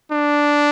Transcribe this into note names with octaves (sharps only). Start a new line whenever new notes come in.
D4